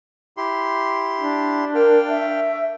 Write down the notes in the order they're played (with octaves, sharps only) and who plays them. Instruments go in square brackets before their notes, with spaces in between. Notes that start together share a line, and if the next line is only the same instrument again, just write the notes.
[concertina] E4 G4 C6
[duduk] D4
[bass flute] A#4 [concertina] F5 G5
[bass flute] E5